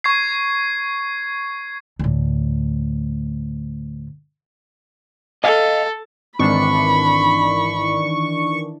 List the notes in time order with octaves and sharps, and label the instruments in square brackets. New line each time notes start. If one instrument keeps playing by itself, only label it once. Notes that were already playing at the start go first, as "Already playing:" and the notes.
[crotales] C#6 G#6 C7
[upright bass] D2 A2
[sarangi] A4 [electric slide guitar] D#5 F5
[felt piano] G#1 [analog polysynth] D#3 E3 D4 [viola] B5 [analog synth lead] C#6